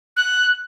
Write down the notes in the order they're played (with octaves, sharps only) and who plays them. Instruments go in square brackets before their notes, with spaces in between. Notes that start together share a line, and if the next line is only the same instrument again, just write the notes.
[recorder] F#6